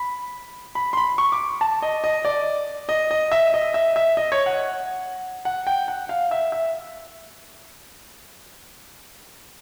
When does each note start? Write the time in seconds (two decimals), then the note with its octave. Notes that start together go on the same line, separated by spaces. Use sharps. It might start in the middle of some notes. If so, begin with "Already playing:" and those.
Already playing: B5
0.75 B5
0.93 C6
0.97 B5
1.18 C#6
1.32 D6
1.61 A5
1.82 D#5
2.04 D#5
2.25 D5
2.89 D#5
3.11 D#5
3.32 E5
3.54 D#5
3.74 E5
3.96 E5
4.17 D#5
4.32 C#5
4.46 F#5
5.45 F#5
5.67 G5
5.88 F#5
6.09 F5
6.31 E5
6.52 E5